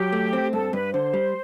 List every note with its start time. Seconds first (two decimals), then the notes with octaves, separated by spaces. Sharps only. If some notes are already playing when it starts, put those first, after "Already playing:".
Already playing: F#3 G4
0.12 A3
0.33 C4
0.53 G2 A4
0.73 G2 B4
0.93 D3 C5
1.14 G3